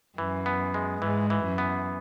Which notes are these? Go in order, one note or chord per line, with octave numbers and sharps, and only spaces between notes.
F#2 E3
B3
G#3
G#2 E3
E3
F#2
B3